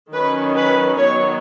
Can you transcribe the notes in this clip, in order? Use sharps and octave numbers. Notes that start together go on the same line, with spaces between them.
D#3 F#3 C#4 B4
B4
D#3 F#3 B3 C#5